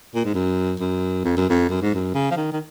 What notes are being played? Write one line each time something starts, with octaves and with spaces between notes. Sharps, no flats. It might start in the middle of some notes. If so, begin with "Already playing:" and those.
A#2
G#2
F#2
F#2
F2
F#2
F2
F#2
G#2
F#2
C#3
F3
D#3
D#3